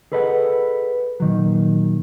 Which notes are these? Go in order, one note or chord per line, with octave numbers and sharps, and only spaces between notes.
G#4 A4 B4 D#5 E5 F#5
A#2 D#3 F#3